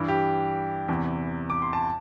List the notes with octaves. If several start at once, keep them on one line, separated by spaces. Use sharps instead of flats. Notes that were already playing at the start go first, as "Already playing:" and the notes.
Already playing: G2 E3
G4
E2 C3 E3
D6
C6
A5